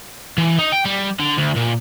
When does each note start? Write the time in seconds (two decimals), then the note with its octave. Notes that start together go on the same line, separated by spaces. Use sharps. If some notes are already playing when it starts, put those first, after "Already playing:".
0.38 E3
0.59 D#4
0.72 G5
0.85 G3
1.20 D3
1.38 D2
1.56 A#2